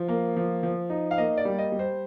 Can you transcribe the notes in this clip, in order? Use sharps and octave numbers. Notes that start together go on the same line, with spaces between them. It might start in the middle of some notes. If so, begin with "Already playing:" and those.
Already playing: F3
A#3
F3
F3
D#4
F5
A#3 D#5
D5
G3
D#5
G3
C5